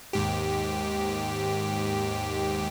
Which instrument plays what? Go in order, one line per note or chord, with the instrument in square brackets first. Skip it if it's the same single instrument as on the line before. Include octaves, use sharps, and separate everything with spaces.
[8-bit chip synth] D#2 G#2 G4